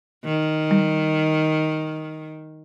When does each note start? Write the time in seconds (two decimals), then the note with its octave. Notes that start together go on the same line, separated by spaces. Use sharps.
0.25 D#3
0.71 G3